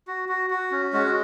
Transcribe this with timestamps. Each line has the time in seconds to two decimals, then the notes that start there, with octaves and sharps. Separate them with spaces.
0.07 F#4
0.29 F#4
0.50 F#4
0.72 C#4
0.93 G#3 F#4